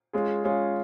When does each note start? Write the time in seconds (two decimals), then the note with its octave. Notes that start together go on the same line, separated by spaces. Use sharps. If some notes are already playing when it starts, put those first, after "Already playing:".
0.13 G#3 C#4 F4 G#4
0.44 G#3 C#4 F4 G#4